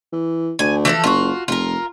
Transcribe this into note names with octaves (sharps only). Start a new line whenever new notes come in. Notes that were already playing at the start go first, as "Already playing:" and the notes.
E3
D2 G#5
E3 F3 A4
F#1 F4 F#4
F1 F4 A#4